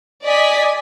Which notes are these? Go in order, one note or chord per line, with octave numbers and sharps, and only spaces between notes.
D5 D#5 G#5 B6